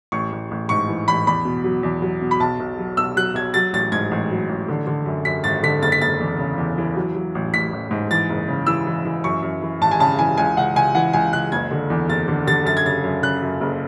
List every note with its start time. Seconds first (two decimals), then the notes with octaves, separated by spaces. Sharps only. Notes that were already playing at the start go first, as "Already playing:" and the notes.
0.12 A1 C#6
0.32 A1
0.51 A1
0.69 G#2 C#6
0.88 E3
1.08 A1 B5
1.27 E2 B5
1.45 B2
1.64 F#3
1.83 E2
2.02 F#3
2.22 B2
2.31 B5
2.40 B1 A5
2.60 B1
2.79 F#3
2.97 B1 E6
3.16 F#3 F#6
3.35 B1 G#6
3.54 F#3 A6
3.73 A1 A6
3.92 G#2 G#6
4.11 A1
4.31 F#3
4.49 A1
4.68 D3
4.87 D3
5.06 F#2
5.25 F#2 B6
5.44 G#1 A6
5.63 D3 B6
5.82 F#1 A6
5.92 B6
6.01 F#1 A6
6.20 E2
6.39 C#3
6.58 E2
6.78 E3
6.96 F#3
7.15 F#3
7.35 A1
7.53 A1 B6
7.73 A1
7.91 G#2
8.11 E3 A6
8.30 F#1
8.48 C#3
8.67 E3 E6
8.87 E3
9.05 E3
9.24 F#2 C#6
9.42 F#2
9.62 E3
9.81 G#1 A5
9.91 G#5
9.99 C#3 A5
10.19 E3 G#5
10.38 C#2 G#5
10.57 C#2 F#5
10.75 C#2 G#5
10.95 E3 F#5
11.13 C#2 G#5
11.33 C#2 F#6
11.52 F#1 G#6
11.71 D3
11.90 E2
12.09 F#1 A6
12.28 D3
12.47 D3 A6
12.65 F#2 A6
12.77 G#6
12.85 C#3 A6
13.04 F#2
13.22 C#3 F#6
13.42 F#2
13.61 F#1